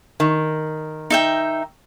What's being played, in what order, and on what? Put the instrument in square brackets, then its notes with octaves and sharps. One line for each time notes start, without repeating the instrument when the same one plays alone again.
[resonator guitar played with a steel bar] D#3
[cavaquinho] D#4 E5 G5